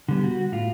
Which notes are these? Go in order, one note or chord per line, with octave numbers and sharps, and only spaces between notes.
D3 G3 B3
F#4
A2 F4